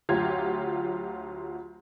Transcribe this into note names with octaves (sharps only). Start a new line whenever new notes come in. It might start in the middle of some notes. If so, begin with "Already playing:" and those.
D2 F#3 F4 G4 G#6